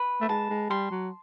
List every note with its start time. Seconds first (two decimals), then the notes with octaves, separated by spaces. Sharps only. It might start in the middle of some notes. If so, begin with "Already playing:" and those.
Already playing: B4
0.21 A3
0.29 G#3 A5
0.50 G#3
0.70 G3 C6
0.91 F#3